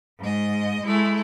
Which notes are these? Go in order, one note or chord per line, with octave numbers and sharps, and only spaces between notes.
G#2 D#5
G#3 A3 E4